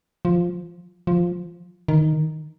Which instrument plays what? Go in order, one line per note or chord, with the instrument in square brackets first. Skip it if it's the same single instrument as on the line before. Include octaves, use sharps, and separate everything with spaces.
[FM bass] F3
F3
D#3